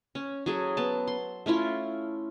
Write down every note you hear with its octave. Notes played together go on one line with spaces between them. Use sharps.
C#4
F#3 G#4 A4
B3 A5
C6
A3 C#4 E4 F4